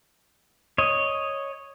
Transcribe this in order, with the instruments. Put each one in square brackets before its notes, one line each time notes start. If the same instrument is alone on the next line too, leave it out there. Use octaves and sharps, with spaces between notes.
[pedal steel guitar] C#5 D#5